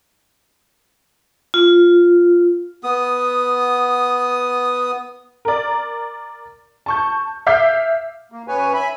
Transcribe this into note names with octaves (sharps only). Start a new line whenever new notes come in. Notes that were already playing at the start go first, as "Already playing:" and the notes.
F4
B3 D#6
A#4 D5
A5 C#6 G6
E5 F5 D6 G6 C7
A#3
F#2 B3 B4 C#5 G#5
E5 G#5 B5